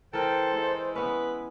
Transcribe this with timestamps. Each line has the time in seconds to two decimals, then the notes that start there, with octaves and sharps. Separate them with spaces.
0.13 E3 A4 A#4 C5 G5
0.52 G#3 E4
0.95 B3 C#4 B4